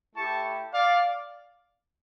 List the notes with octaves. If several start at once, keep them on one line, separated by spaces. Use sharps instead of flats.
A3 E4 G4 A5 C#6
D5 F5